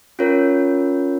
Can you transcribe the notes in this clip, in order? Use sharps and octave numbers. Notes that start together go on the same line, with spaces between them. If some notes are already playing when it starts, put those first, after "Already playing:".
C#4 F4 A#4 C#5